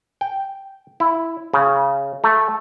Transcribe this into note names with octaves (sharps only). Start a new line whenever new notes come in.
G5
E4
C#3
A3